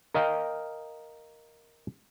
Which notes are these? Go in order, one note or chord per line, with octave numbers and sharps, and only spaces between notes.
A#4 D#5 F5 G5